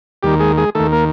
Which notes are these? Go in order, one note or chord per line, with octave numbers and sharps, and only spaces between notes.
D#2 D#3 G3 G4
G#3 G#4
G#3 G#4
D#2 D#3 A3 A4
A#3 A#4